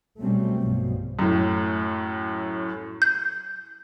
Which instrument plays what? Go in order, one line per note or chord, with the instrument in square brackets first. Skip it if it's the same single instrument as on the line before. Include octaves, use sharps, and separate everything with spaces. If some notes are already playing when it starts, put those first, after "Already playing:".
[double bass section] B2 F#3 G3 A3 C4 C#4
B1 G2 B2 F3
[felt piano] F#2 A2
[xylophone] G6